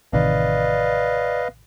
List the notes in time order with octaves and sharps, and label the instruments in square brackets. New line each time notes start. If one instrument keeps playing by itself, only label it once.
[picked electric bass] A1 C3 D#3 [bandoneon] B4 D#5 F5 [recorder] D5